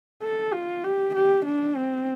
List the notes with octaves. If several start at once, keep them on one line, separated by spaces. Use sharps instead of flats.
A4
F4
G4
G4
D4
C4